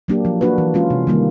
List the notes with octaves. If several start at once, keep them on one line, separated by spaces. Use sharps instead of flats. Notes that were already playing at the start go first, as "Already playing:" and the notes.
F#3 A#3 D4 G4
F3
A#3 D4 F#4 B4
E3
G#3 C#4 F4
C3
D#3 G3 A#3